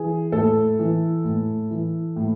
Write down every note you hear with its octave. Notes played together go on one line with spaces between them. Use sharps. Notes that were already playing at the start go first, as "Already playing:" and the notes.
Already playing: E3 G#4
A2 A4
E3
A2
E3
A2